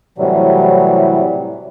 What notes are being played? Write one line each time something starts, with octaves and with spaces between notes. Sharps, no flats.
A2 C3 E3 F#3 G3